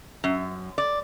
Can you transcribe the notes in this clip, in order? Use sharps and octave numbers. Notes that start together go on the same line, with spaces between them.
F#2
D5